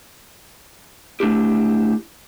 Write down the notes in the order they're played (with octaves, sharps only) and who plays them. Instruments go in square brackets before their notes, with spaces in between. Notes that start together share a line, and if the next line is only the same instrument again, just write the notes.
[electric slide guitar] A3 D4 E4 G4